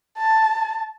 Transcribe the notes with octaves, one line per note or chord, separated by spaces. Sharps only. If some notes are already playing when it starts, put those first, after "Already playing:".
A5